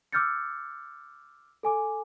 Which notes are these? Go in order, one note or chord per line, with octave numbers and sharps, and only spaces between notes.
D6 E6 F6 G6 A6 C#7
A4 G#5 D6